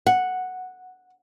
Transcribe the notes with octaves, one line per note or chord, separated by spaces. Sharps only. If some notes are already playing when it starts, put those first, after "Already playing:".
F#5